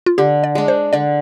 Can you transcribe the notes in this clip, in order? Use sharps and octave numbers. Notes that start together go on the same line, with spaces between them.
F4
D3 G4
D5
G#3 D4
C5
D3 D5